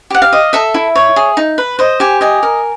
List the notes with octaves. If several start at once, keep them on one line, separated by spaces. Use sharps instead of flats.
G4 F#5
F5
D#5
A4 E5
E4
C#5
G#4
D#4
B4
C5 D#5
G4 G#5
D#5 G#5
A#4